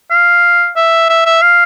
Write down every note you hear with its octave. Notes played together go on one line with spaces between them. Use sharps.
F5
E5
E5
E5
F5